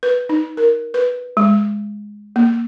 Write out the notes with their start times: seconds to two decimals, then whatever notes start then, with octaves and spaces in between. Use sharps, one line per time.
0.03 B4
0.29 D#4
0.57 A#4
0.94 B4
1.37 G#3
2.36 A#3